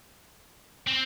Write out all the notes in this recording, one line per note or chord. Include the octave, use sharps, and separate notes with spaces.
C4